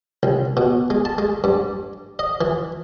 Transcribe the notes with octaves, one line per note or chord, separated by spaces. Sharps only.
C2
B2
G#3
A5
G#3
G2
D#5
E3